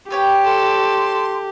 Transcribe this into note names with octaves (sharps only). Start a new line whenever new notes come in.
G4 B4 C#5 G5
A4 C6